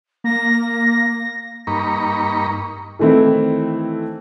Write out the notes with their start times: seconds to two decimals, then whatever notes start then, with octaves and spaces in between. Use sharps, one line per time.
0.24 A#3 A#6
1.67 G2 A#3 D#4 A#5 B5 C#6
2.99 D#3 E3 A3 C4 E4